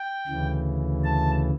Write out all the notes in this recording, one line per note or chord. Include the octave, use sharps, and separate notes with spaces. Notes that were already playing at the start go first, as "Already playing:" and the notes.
Already playing: G5
D2 C#3 E3
A5